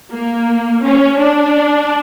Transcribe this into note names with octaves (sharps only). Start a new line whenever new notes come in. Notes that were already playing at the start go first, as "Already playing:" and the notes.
A#3
C#4
D4